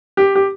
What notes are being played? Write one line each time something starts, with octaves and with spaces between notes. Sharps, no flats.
G4
G4